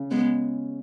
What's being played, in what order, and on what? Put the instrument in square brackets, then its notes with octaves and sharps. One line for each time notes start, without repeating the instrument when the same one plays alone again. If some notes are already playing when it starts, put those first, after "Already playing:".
Already playing: [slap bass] C#3
[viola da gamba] G#3 B3